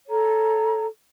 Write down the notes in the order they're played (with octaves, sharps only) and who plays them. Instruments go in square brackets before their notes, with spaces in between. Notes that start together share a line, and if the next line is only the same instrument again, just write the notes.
[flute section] A4 C#5 A#5